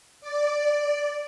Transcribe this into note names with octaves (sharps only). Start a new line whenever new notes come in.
D5